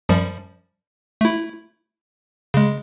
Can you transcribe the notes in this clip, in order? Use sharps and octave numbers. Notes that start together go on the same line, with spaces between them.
F#2 F3 G3
A3 E4
C#3 G#3